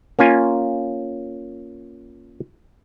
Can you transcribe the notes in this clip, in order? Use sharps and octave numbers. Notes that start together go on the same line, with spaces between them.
A#3 C#4 F4 G#5